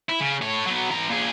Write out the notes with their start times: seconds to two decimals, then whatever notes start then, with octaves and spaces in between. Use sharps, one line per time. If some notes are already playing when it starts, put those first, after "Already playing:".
0.09 E4
0.21 C#3
0.42 A2 C#5
0.66 F#3 B3
0.91 E3 A#5
1.10 A#2 G#4